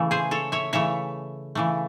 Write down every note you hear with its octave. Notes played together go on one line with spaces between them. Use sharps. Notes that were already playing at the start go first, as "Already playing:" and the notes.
Already playing: C#3 E3 A3
G#4 C5
A4 C#5
C#5 E5
C#3 E3 A3 C#5 E5
C#3 E3 A3